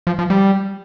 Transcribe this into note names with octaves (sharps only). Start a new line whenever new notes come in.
F3
F3
G3